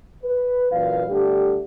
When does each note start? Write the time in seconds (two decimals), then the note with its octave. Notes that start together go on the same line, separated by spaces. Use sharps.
0.24 B4
0.72 F#2 A#2 E3 B4 F5
1.09 D3 G3 A3 G4